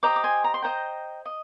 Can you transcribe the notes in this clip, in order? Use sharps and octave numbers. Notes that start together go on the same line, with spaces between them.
G4 C5 D#5 A#5 D6
D6
G#5 C6
A#5
C6
G4 C5 D#5 G5 A#5
D#5